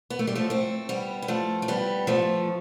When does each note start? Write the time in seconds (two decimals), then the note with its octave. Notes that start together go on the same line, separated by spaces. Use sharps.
0.10 B3
0.19 A3
0.27 G3
0.35 F3 A3
0.50 A3 C4
0.89 G3 B3
1.22 B3
1.28 F3 A3
1.62 A3
1.68 G3 B3
2.07 F3 A3